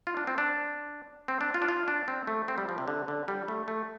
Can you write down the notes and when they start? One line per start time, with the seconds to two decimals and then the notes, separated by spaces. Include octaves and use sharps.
0.07 F4
0.17 D4
0.27 C4
0.38 D4
1.28 C4
1.41 D4
1.54 F4
1.62 D4
1.68 F4
1.88 D4
2.08 C4
2.27 A3
2.48 C4
2.58 G3
2.69 F3
2.78 C3
2.88 D3
3.08 D3
3.28 G3
3.48 A3
3.68 A3